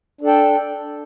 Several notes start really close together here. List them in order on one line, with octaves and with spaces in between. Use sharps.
D4 A4 G5